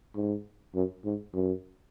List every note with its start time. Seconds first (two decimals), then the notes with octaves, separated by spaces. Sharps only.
0.15 G#2
0.75 F#2
1.05 G#2
1.34 F#2